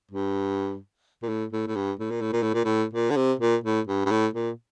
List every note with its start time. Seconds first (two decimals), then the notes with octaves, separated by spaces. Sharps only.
0.11 G2
1.22 A#2
1.29 A2
1.52 A2
1.67 A2
1.76 G2
1.99 A2
2.10 A#2
2.21 A2
2.33 A#2
2.43 A2
2.54 A#2
2.65 A2
2.93 A#2
3.11 D3
3.16 C3
3.40 A#2
3.64 A2
3.87 G2
4.05 G2
4.11 A2
4.34 A#2